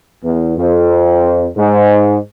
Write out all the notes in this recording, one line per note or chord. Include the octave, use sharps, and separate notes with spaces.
E2
F2
G#2